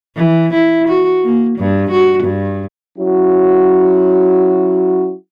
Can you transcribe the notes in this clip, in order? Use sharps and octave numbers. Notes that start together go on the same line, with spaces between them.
E3
E4
F#4
A#3
G2
F#4
G2
F#3 C#4 E4 F#4